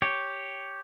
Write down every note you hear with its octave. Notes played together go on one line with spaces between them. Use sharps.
G4 C#5